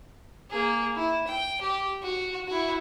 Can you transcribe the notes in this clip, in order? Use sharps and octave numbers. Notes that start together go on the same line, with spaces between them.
A#3 G#4
E4
G5
G4
F#4
E4 F#4